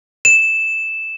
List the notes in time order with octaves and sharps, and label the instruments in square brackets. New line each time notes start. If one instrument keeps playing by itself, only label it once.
[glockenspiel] E7